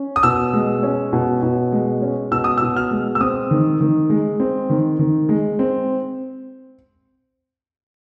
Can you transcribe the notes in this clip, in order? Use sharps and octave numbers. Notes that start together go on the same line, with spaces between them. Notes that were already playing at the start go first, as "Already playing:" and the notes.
Already playing: C#4
D#6
B2 E6
G#3
C#4
B2
B2
G#3
C#4
B2 E6
D#6
B2 E6
F6
G#3
E6
C4 D#6
D#3
D#3
G#3
C4
D#3
D#3
G#3
C4